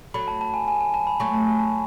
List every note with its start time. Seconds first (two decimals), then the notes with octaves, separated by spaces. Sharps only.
0.14 F#3 A3 B5
0.28 A5
0.41 A5
0.54 G#5
0.68 G#5
0.81 G#5
0.94 A5
1.07 B5
1.20 F#3 A3 C#6
1.34 A5
1.47 G#5
1.59 A5